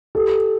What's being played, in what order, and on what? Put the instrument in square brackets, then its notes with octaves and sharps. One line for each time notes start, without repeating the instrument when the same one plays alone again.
[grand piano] G4 A4